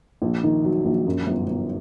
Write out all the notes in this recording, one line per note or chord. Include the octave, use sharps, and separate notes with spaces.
A#1
D#3
F#3
A#1
F#2
G1
G1